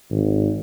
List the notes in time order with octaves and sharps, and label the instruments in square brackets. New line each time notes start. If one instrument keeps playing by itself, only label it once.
[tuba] G#1